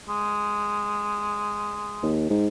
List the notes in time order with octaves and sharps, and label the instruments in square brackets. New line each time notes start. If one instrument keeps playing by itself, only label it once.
[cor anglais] G#3
[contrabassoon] D#2
G#2